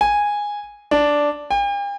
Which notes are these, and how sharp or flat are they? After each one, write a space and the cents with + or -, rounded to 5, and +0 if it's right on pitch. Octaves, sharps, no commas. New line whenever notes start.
G#5 -10
D4 -5
G5 +45